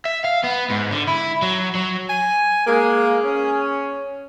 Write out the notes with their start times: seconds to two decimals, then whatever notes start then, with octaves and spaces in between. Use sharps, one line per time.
0.05 E5
0.24 F5
0.44 B3
0.70 G#2
0.91 D3
1.07 E4
1.42 F#3
1.75 F#3
2.09 G#5
2.67 G#3 A#3 G#4
3.25 C#4